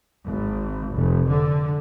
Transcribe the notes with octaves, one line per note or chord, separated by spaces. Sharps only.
G#1
F1
D3